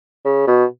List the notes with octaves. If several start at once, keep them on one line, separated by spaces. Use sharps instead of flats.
C#3
B2